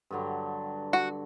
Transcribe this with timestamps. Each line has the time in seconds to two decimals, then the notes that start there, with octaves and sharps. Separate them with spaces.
0.11 G2 D3 F#3
0.93 F#4